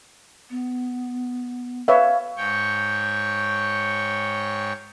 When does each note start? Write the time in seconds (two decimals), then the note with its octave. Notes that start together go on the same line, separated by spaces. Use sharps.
0.50 B3
1.88 B4 C#5 E5 F5
2.37 G#2 C#5 G5 C#6